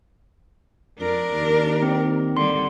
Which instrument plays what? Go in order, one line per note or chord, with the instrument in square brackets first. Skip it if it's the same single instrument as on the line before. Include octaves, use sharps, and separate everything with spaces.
[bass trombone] F2 [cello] D4 A#4
[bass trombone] D#2
[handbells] C4
[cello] D3 G3 [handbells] C6